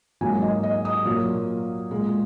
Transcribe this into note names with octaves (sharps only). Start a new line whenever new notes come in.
G#2 F#3 A#3 G#5
D#5
D#5
D#6
A#2 F#3 A#3
A#2 G#3